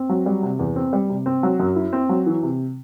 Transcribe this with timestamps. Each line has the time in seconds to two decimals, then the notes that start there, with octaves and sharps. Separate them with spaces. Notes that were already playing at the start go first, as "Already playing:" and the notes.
Already playing: C4
0.09 F#3
0.26 G3
0.43 C3
0.59 E2
0.76 C4
0.93 G3
1.09 C3
1.26 C4
1.43 F#3
1.60 F#2
1.76 E4
1.93 C4
2.09 F#3
2.26 E3
2.43 C3